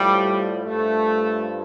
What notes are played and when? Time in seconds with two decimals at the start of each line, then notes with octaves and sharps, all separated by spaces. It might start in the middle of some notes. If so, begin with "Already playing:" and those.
Already playing: A2 F3 G3
0.64 G2 F3 A3